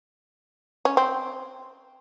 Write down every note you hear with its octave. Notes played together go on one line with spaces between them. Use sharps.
C#4
C4